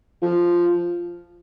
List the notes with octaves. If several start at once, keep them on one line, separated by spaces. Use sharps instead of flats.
F3